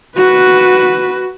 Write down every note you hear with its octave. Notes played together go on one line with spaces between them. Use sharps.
F#4 B4